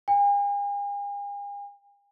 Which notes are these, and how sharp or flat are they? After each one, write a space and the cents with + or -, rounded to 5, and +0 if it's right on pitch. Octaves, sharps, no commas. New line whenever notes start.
G#5 -45